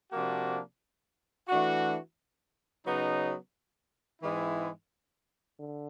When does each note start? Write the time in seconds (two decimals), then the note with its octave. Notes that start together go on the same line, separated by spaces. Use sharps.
0.12 C3 F3 A#3 D4 F#4
1.48 E3 A3 D4 F#4
2.86 C#3 F#3 B3 D#4
4.22 G#2 E3 G#3 C4 E4
5.58 D3